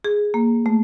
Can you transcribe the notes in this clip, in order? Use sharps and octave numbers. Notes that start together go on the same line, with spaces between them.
G#4
A#3
A3